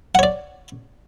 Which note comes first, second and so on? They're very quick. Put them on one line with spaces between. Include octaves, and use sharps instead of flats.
F#5 C#5 D5